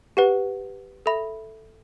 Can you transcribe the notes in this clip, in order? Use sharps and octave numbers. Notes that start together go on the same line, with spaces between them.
G4 B4 F#5
A4 E5 B5